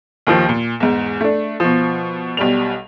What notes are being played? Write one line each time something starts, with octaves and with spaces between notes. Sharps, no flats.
D#2 D#3 F3
A#2
E2 G#2
A3 D4
B2 F3
B1 B2 G3 F7